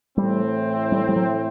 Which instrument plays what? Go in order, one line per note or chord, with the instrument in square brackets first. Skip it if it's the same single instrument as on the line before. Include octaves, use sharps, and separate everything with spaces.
[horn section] A2 E3 A3 C4 [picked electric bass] G3
[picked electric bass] G3
G3
F#3